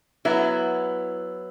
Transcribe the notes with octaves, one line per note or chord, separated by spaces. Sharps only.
F#3 B3 E4